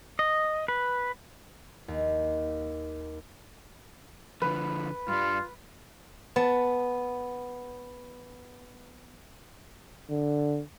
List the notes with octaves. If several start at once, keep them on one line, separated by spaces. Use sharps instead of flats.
D#5
B4
D#2
D3 F3 B4
G2 G3 F4
B3 A5
D3